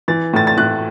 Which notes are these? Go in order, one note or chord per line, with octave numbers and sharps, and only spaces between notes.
E3 A6
A2 A6
A6
A2 F#6